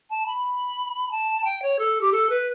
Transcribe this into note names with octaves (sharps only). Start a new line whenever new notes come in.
A5
B5
A5
G5
C#5
A4
G4
A4
B4